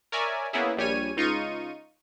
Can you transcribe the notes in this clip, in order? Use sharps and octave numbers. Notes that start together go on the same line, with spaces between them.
A#4 C#5 D5 E5 G#5
A#3 B3 C#4 E4 G#4
A#1 G3 C#5 G#5 D#7
C#2 D#4 F4 C#6 D#7